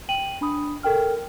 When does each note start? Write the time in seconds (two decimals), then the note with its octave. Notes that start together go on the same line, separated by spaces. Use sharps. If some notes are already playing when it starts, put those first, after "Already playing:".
0.09 G5 D#7 F#7
0.41 D4 B5 D#6
0.83 A4 A#4 G5 F6